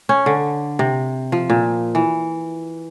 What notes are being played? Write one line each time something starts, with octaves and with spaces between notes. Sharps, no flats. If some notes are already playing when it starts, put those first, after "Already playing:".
C#4
D3
C3
F3
A#2
E3